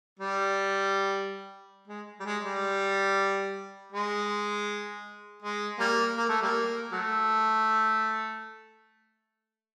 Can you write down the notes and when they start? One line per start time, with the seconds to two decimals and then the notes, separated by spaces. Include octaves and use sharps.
0.19 G3
1.88 G#3
2.20 G3
2.25 G#3
2.44 G3
3.92 G#3
5.42 G#3
5.79 G3 A#3
6.17 A#3
6.29 A3
6.42 G3 A#3
6.92 F#3 A3